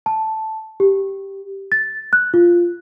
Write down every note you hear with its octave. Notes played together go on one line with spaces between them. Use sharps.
A5
G4
A6
F#6
F4